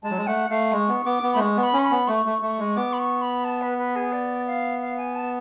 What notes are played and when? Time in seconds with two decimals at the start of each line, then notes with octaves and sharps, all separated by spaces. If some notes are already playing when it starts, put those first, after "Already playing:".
0.03 G#3 A5
0.11 F#3
0.18 G#3
0.27 A3 F#5
0.50 A3 F5
0.72 G#3 C#6
0.89 B3
1.06 B3 D6
1.23 B3
1.33 A3 B5
1.39 G#3 C#6
1.57 B3
1.63 B5
1.73 C#4
1.79 C#6
1.85 B5
1.91 B3
2.08 A3 C#6
2.26 A3
2.42 A3 C#6
2.59 G#3
2.76 B3 D6
2.93 B5
2.99 C#6
3.22 B5
3.44 A5
3.62 B4
3.78 B4
3.96 G#4
4.12 D5
4.47 F5
4.81 F5
4.97 G#5
5.15 A5